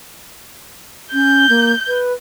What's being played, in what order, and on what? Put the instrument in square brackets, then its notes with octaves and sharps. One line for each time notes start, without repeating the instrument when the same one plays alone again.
[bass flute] C#4 [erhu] G6
[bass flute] A#3
B4